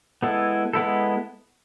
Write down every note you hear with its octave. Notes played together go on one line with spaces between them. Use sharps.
G#3 B3 E4 A4
G#3 B3 E4 A4